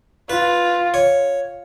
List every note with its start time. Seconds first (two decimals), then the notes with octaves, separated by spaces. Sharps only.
0.30 F4 B4
0.94 C#5